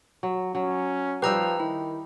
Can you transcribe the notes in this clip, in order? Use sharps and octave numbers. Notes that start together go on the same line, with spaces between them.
F#3
F#3 C#4
F3 G3 D#4 G4 B4 A#5 E6
D#3 E4